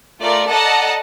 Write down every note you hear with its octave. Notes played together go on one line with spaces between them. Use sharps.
A3 F4 A#4 D5
A4 D5 D#5 F#5 A5 A#5